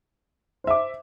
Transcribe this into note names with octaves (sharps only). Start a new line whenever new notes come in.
C5 E5 D6